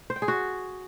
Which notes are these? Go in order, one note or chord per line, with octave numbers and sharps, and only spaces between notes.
C5
G5
G#4
F#4